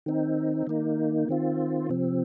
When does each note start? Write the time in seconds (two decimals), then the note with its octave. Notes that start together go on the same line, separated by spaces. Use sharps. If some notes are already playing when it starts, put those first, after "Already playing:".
0.06 D#3 C4 D#4
0.67 D#3 A#3 D#4
1.29 D#3 C4 F4
1.89 C3 F3 C4